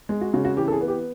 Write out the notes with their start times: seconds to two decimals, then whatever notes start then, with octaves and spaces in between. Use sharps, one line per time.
0.09 G#3
0.21 F#4
0.34 C#3 F#4
0.45 F#4
0.57 E3 G4
0.68 A4
0.72 G#4
0.81 B3
0.88 G4